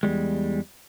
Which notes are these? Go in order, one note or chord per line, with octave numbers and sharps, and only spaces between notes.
E2 G3 G#3